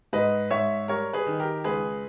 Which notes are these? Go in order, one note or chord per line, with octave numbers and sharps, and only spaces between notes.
G#2 B4 D#5
G#2 C#5 E5
G3 A#4 C#5
G#4 B4
D#3
G4 A#4
C#2 G#4 B4